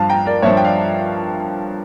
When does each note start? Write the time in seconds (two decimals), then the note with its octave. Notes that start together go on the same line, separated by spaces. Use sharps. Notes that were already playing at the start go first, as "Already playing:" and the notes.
Already playing: G2 F3 F5 A5
0.10 G5 A#5
0.25 A#4 D5
0.42 G2 F3 C#5 E5
0.57 G5
0.65 D5 F5